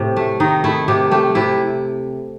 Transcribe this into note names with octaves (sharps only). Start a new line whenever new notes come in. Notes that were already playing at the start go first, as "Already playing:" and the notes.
Already playing: A2 C3 C4
A3
D#3 D#4
A3 E4
C3 G4
A3 G4
C3 E4